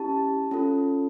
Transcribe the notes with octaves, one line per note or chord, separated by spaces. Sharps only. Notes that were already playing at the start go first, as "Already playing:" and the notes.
Already playing: C#4 E4 G4 A5
C#4 F4 A4